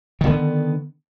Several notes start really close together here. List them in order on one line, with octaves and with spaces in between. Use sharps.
D#3 D3 B3